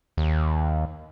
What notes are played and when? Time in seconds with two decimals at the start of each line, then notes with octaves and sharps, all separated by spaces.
0.17 D#2